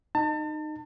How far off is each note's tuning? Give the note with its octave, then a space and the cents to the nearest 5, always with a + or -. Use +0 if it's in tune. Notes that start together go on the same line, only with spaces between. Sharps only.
D#4 -20 A5 +35